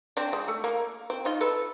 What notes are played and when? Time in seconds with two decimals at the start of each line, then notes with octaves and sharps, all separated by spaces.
0.17 C4 D4
0.33 G#3
0.48 A3
0.64 A#3
1.10 C4
1.25 D#4 F4
1.41 A4 B4